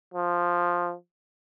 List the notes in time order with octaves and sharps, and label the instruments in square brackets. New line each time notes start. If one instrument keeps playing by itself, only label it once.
[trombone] F3